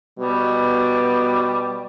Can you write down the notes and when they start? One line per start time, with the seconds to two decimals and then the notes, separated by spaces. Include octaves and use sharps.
0.19 B2 G3